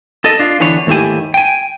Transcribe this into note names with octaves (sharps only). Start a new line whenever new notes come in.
A4 D#5
D4 F4
D3 E3 B3 D4 C#5
D#2 G#2 A3 E4 G4 G#5
G5 G#5